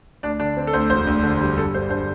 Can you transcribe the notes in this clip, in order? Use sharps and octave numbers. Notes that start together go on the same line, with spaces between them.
D2 D4 D5
D3 D4 D5
C4
A4
D2 C5
E1 C5
D2
D3
G3
G1 A4
G2 C5
D3 C5